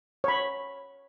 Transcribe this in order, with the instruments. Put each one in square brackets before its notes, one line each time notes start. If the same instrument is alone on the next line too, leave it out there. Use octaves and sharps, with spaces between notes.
[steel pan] C#5 B5